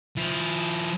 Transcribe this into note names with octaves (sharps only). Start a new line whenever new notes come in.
F3 E4